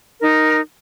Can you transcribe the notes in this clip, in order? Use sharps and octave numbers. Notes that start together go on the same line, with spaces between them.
D#4 A#4